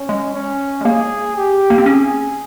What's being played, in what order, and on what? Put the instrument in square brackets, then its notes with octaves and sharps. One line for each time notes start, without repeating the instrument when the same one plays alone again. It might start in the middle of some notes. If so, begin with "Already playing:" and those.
Already playing: [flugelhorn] C#4
[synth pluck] G#3
[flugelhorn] C#4
[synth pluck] G#3
[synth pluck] A#3 [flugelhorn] G#4
[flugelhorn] G4
[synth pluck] A#3
C4
[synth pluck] C#4 [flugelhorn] G#4